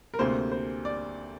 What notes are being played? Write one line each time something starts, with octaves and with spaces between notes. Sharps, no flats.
A#4
D2 C3 A#3 C5
C5
D5